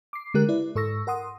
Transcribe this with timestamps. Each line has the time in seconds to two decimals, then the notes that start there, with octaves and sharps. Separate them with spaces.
0.13 D6 C7
0.34 D3 G#3 G4 A#4 F#6
0.49 E4 B4 D5
0.75 G#2 A4 C#6 E6 A#6
1.07 A#4 F#5 C6 D#6